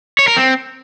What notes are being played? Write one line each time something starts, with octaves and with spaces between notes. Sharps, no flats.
C#5
A#4
C4